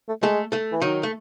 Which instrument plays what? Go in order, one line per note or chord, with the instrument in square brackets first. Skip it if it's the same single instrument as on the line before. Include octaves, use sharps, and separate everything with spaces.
[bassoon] A3
[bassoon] G#3 [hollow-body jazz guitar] A3 A4
[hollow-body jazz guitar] A3 A4
[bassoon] E3
[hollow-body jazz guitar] D#3 D#4 [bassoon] F#3
[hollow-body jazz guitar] A3